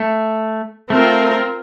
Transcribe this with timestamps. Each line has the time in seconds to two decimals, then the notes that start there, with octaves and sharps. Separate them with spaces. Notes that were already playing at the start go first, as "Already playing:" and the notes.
Already playing: A3
0.90 A3 C4 F4 A#4